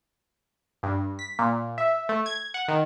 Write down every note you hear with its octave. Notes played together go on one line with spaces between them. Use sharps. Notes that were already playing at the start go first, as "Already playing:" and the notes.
G2
B6
A#2
E5
A3
G#6
F#5
D#3